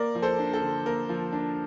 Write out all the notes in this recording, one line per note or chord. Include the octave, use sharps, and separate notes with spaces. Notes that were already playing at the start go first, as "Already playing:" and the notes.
Already playing: A#3 A#4 D5
F3
A4 C5
D4
A4
D3
A#3 A#4
F3
D4